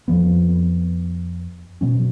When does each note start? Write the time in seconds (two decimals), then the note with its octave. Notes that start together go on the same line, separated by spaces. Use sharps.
0.08 F2 F3 B3
1.81 B2 F#3 C#4